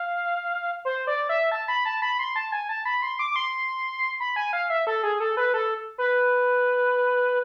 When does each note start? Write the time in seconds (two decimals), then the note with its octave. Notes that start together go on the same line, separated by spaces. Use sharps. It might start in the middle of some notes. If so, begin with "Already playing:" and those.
Already playing: F5
0.85 C5
1.07 D5
1.29 E5
1.52 A5
1.68 B5
1.85 A5
2.02 B5
2.19 C6
2.36 A5
2.52 G#5
2.69 A5
2.85 B5
3.02 C6
3.19 D6
3.31 D6
3.36 C6
4.20 B5
4.36 G#5
4.53 F5
4.70 E5
4.87 A4
5.03 G#4
5.20 A4
5.37 B4
5.54 A4
5.98 B4